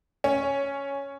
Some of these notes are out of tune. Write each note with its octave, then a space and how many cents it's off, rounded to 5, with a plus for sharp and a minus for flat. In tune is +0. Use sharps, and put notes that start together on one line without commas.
C#4 +0